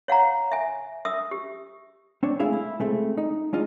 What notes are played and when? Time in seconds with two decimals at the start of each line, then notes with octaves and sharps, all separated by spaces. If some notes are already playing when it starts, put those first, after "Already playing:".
0.08 C#5 F5 F#5 A#5
0.52 E5 G#5
1.05 E5 D#6 E6
1.31 G4
2.23 C4 D4 C#5
2.40 G#3 A3 E4 G#4 E5 F5
2.53 E4
2.80 G#3 A3 C4
3.17 D#4
3.53 G#3 D4 D#4 F4